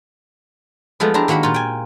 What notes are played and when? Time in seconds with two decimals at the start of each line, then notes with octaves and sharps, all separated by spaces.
1.00 F3 G#3 A3 B3
1.14 D4 E4 G4 C5 A#5
1.28 D#3 A#3 F#4 F#5 B5
1.43 A#2 F4
1.54 G5 G#5